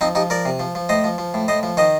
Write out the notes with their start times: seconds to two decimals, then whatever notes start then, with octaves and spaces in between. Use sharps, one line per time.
0.01 F3 C4 D#4
0.15 F3 D#4 G4
0.30 F3 A#4 D5
0.45 C3
0.60 F3
0.75 F3
0.89 A2 C5 D#5
1.04 F3
1.18 F3
1.34 A2
1.48 A2 C5 D#5
1.63 F3
1.77 D#3 C5 D#5